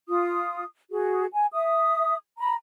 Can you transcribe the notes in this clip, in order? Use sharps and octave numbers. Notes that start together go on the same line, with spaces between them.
F4 D#6
F#4 G#4
G#5
E5 D#6
A#5 B5